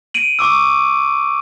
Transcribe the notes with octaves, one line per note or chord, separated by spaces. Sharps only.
D7 D#7 F#7
C#6 D6 E6